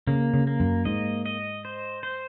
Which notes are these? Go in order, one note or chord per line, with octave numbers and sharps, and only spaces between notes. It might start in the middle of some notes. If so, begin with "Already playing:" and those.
C#3 A#3
C#3
A#3
F#2
G#2 D#5
D#5
C5
C5